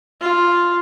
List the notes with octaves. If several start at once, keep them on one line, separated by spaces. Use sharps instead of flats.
F4